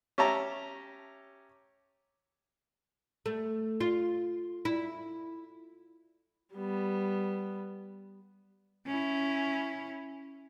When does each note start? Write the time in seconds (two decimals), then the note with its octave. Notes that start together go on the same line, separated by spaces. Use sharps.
0.18 C#4 G4 E5 A5 A#5
3.26 A3
3.80 F4
4.65 E4
6.54 G3 B3
8.87 C#4 E4